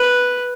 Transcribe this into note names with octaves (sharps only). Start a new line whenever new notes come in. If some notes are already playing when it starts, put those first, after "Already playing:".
Already playing: B4